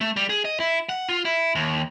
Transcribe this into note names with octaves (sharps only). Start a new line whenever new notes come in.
A3
G3
G#4
D#5
E4
F#5
F4
E4
D#2